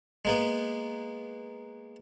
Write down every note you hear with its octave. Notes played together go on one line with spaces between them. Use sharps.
G#3 A#3 B3